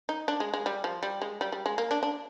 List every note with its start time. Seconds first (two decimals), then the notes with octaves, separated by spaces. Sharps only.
0.09 D#4
0.28 D4
0.40 G#3
0.54 G#3
0.66 G3
0.84 F3
1.03 G3
1.22 G#3
1.41 G3
1.52 G3
1.66 G#3
1.78 A#3
1.91 D4
2.03 D4